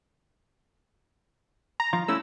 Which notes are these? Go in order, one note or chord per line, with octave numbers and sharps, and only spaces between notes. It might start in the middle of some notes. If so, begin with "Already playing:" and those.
A#5
F3 F4
A3 C#4 E4 E6